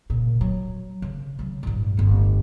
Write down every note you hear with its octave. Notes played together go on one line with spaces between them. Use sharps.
A#2 C#3
F#3
C#3
C#3 F#3
A1 G2
D1 G1